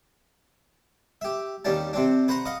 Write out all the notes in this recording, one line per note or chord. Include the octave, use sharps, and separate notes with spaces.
G4 E5
D#2 G3 C#4 D4 A5
C3 C4 D4
B4 C5 F#5 A#5 C6
D#5 F5 F#5 D#6